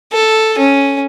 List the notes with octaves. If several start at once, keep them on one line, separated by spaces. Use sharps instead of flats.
A4
C#4